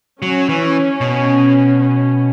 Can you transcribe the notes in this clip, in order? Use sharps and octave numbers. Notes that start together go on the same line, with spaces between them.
F#3 C#4
E3
B2
C#4